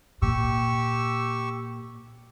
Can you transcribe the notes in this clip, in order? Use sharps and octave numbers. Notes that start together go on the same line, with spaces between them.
A#2 G4 C#6 E6